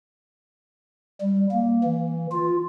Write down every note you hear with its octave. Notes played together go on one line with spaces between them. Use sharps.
G3
A#3
E3
F4